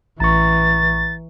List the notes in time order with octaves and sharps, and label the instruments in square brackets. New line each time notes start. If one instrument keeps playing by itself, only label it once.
[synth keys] A1 [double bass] E3 [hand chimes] A#5 C#6 [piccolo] A6